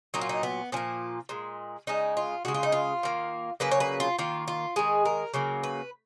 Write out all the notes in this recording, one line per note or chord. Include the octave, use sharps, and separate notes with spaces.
A#2 F#3 A#3 D#4
F4
D#4
B3
A#2 F3 A#3 C#4
A#2 G#3
C#3 G#3 D#4
F4
C#3 G#3 F#4
F4
D#4
F4
D#3 A#3
C#3 F#3 A#3 B4
C#5
B4
F4
D#3 A#3 F4
F4
D#3 G#3 G#4
A#4
C#3 F#3 A#3
B4